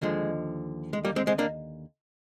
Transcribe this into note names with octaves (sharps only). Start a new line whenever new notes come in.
D#2 D3 F3 G#3
G#3
G3 A#3
G#3 C4
G#3 C4
A#3 D4